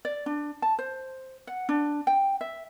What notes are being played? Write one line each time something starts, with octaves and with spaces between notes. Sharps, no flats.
D5
D4
A5
C5
F#5
D4
G5
E5